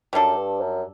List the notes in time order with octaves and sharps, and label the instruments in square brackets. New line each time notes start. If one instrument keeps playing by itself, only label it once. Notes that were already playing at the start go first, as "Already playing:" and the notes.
[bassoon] F#2 [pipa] G3 D4 A4
[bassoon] G2
F#2